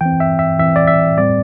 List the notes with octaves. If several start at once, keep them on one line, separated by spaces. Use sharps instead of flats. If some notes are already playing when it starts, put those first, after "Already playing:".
E3 C4 G5
E5
E5
E3 C4 E5
D5
E5
A2 G3 C4 D5